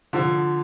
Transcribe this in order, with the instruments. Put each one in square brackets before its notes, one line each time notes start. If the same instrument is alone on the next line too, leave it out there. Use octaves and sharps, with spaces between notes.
[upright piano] D3 F3